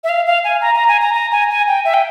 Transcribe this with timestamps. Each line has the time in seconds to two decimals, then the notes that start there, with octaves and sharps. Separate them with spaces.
0.04 E5
0.09 F5
0.26 F5
0.44 G#5
0.61 A#5
0.75 A#5
0.88 G#5
1.02 A#5
1.14 A#5
1.31 G#5
1.50 G#5
1.68 G5
1.85 E5
1.94 G5